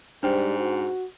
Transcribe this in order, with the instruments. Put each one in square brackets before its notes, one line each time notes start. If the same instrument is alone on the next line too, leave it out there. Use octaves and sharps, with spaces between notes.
[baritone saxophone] G#2 [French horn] G3 [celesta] D4 C5 G5
[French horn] F#4